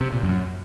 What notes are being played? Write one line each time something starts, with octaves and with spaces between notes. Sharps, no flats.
C3
A#2
F#2